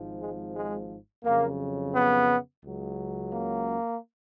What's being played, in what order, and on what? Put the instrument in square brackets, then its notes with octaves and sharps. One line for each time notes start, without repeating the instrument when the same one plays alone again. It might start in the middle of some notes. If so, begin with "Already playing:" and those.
Already playing: [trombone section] G#1 G#2 F3
G#3
G#3
F2 C#3 F#3 A#3
B3
C#2 C#3 F#3
A#3